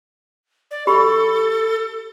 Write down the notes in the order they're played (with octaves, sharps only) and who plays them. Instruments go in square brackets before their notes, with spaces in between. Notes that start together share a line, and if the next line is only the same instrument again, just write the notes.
[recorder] D5
[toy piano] G4 B5 C#6 [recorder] A4